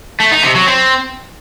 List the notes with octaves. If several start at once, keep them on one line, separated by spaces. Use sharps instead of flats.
A3
D#4
C3
F#3
C4